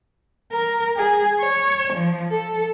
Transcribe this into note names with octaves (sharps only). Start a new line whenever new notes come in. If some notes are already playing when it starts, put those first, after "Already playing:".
A#4
G#4
C#5
F3
A4